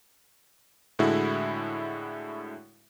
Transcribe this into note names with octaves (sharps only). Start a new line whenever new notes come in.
A2 D3 G#3 E4 F#4